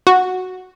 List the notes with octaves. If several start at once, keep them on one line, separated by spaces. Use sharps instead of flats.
F#4